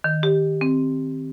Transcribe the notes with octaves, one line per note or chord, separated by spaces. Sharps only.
D#3
G4
C4